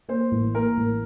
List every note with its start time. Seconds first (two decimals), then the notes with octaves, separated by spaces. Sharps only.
0.08 A#3 C5
0.31 A1
0.54 A#3 A#4
0.77 A1